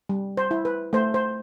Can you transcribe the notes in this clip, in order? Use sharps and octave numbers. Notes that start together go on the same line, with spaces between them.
G3
C5
E4
B4
A3 C5
C5